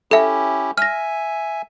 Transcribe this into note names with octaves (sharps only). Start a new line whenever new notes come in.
C#4 E4 G4 A4 E5
E5 G#5 F6 A#6